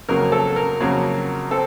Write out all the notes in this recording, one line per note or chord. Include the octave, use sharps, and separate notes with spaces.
F2 C#3 F#3 A#3 A#4
A4
A#4
F2 C#3 F#3 A#3
C4 A4